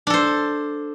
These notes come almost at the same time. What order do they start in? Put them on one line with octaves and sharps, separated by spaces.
D4 A4 C5